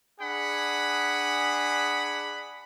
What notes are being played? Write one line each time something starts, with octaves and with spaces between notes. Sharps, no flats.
D4 G#4 F#5 B5